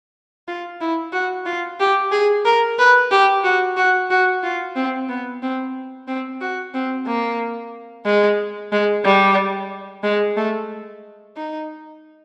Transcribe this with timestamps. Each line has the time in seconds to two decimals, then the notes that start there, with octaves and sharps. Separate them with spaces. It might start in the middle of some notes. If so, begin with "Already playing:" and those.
0.48 F4
0.80 E4
1.13 F#4
1.46 F4
1.80 G4
2.12 G#4
2.45 A#4
2.78 B4
3.11 G4
3.44 F#4
3.77 F#4
4.10 F#4
4.43 F4
4.76 C4
5.09 B3
5.43 C4
6.08 C4
6.41 F#4
6.74 C4
7.06 A#3
8.05 G#3
8.72 G#3
9.05 G3
10.03 G#3
10.36 A3
11.36 D#4